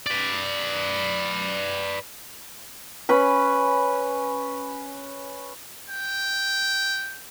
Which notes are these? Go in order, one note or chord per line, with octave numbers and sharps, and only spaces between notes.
B4 D5
C#4 B4 B5
G5